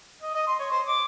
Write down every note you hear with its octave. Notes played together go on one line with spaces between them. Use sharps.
D#5
D#5
C6
C#5
C5
D6